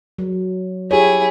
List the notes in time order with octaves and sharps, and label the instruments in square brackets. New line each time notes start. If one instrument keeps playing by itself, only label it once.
[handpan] F#3
[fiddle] E4 G#4 [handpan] G4 C#5